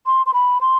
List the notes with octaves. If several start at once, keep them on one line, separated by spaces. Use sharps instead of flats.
C6
C6
B5
C6